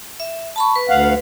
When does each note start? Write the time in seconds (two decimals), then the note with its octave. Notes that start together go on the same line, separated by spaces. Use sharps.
0.20 E5
0.56 A5 B5 C#6
0.76 B4
0.89 D2 F5 F#5